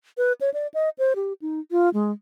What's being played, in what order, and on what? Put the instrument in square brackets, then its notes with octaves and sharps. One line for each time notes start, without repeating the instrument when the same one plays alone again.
[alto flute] B4
C#5
D5
D#5
C5
G4
D#4
F4
G#3